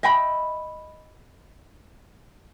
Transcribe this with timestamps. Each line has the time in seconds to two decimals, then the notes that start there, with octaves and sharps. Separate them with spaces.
0.03 D#5 E5 G5 B5